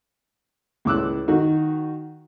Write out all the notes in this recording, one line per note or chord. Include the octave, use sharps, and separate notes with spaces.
C#2 A2 D6 E6 F#6
D#3 D#4 F#4